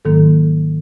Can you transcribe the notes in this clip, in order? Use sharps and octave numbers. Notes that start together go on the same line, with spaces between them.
G#2 D#3 F#3 A#3 A4